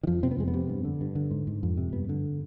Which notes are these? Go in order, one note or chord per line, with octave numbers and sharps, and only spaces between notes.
D#3
F2 F3
C3 C4
B3
F2 G#3
B3
C3
G2
D3
G2
D3
G#2
G#2
F2
C3
G2 B3
D3